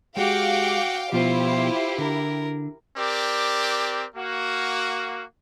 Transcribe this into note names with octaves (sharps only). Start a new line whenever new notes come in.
G#3 F#4 G4 F5 G5 D6
B2 F3 E4 F4 G4 C5
D3 A#4
C4 G4 A#4 D5
A#3 F#4